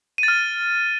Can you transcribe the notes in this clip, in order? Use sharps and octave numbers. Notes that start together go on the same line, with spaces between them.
D#7
A6
F6